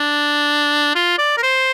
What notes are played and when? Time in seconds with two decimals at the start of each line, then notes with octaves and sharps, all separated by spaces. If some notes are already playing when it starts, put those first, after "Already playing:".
Already playing: D4
0.95 F4
1.18 D5
1.37 A#4
1.43 C5